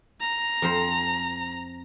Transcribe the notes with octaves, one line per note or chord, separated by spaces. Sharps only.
A#5
F2 F3 C5